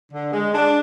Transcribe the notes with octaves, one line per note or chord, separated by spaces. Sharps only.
D3
G#3
D4